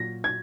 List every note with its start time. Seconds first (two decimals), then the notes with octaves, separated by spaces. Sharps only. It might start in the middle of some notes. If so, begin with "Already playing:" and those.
Already playing: A#2 F#3 A#6
0.24 G#6